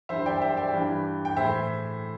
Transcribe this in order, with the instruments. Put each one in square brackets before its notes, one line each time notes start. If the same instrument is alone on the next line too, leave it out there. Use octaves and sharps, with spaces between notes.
[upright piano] G2 E3 C5 E5
D5 G5
C5 E5
D5 G5
G2 E3
G5
A2 E3 C5 E5